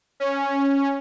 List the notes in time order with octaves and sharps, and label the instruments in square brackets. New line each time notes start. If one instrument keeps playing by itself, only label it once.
[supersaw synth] C#4